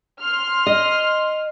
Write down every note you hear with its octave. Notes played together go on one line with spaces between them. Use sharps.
C6 F6
D#5